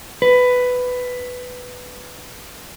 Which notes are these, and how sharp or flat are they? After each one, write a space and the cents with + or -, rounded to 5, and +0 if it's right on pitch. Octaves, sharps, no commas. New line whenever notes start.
B4 +10